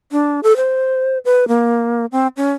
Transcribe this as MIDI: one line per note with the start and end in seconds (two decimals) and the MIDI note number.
0.12 0.40 62
0.43 0.56 69
0.56 1.18 72
1.25 1.48 71
1.48 2.06 58
2.12 2.27 60
2.37 2.52 61